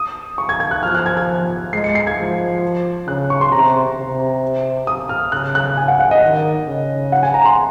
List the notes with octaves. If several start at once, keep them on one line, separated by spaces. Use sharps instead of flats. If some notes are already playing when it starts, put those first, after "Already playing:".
Already playing: D#6
C#6
G#6
G#6
F#6
F3 F6
F#6
G#6
G#6
G#3 C7
C#7
C7
G#6
F3
C#3 F#6
C#6
C6
C3 A#5
C3
D#6
F6
C#3 F#6
F#6
G#5
F#5
F#5
D#5
D#3
C#3
F#5
G#5
A#5
C6